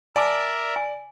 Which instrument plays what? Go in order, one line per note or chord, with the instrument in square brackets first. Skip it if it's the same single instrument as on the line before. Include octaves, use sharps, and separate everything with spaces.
[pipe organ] A#4 E5 [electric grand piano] D5 [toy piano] G#5 A5 D6
[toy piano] G#5